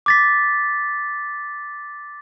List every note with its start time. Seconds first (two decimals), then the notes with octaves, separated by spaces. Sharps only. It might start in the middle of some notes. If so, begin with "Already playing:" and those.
0.06 D6 A6 B6